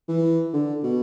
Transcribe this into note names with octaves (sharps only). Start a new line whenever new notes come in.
E3
D3
B2